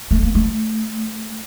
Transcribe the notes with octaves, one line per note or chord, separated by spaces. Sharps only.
A3
A#3
A3